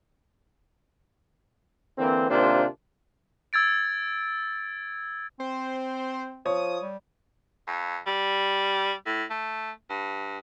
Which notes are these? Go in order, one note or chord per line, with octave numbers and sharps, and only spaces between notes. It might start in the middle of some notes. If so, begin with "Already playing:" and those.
D3 E3 A#3 C4
D#2 C3 A#3 D4 F4 C5
E6 G#6 A6 D7
C4 C5
F3 C#5 D#6
G3
F2
G3
A2
A3
G2